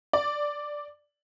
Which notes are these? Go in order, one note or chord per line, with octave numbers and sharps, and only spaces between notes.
D5